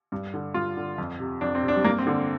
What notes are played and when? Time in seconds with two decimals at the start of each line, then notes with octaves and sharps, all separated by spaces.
0.12 G2
0.34 D3
0.54 G2 F4
0.77 D3
0.98 F2
1.20 C3
1.41 F2 D4
1.55 C4
1.63 C3
1.68 D4
1.76 G3
1.84 G2 A#3
1.99 C4
2.07 D3